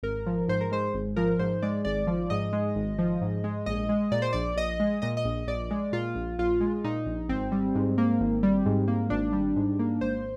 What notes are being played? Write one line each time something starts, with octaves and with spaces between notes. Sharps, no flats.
G#1 A#4
F3
G#2 C5
A#4
G#3 C5
G#1
F3 A#4
G#2 C5
G#3 D5
G#1 D5
F3
G#2 D#5
G#3
G#1
F3
G#2
G#3
A#1 D#5
G#3
A#2 D5
C5
A#1 D5
A#1 D#5
G#3
A#2 D#5
D#5
A#1
A#1 D5
G#3
A#2 F4
A#1
A#1 F4
G#3
A#2 D#4
A#1
G#1 C4
G3
G#2
A#3
G#1
G3
G#2
A#3
G#1 D4
G3
G#2
A#3
G#1 C5